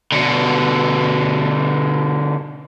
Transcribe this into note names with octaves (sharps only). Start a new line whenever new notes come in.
B2 D3